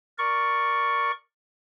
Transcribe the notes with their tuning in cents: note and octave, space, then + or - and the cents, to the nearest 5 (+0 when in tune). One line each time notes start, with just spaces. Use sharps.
A#4 +0 D5 +0 C#6 +0